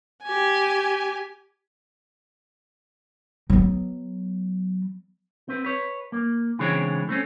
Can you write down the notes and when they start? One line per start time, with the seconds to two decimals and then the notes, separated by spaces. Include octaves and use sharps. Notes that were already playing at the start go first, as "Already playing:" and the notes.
0.24 G4 G#5
3.50 F#3 B3
5.49 C4 B4
5.65 B4 C#5
6.12 A#3
6.59 C#3 E3 G#3 C4 D4 C#5
7.09 A3 C4 C#4